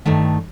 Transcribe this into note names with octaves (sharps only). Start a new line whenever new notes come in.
G2 D#3 A3